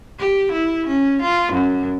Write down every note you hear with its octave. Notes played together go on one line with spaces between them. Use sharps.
G4
E4
C#4
F4
F#2